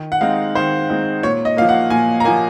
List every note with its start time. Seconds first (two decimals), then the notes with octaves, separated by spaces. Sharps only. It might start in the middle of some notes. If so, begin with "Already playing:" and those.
Already playing: D#3
0.12 F#5
0.21 G#3 C4 D#4 F5
0.55 D#3 C5
0.89 G#3 C4 D#4
1.23 A#2 C#5
1.45 D#5
1.57 F3 A#3 F5
1.69 F#5
1.90 A#2 G#5
2.20 A#5
2.24 F3 A#3 G#5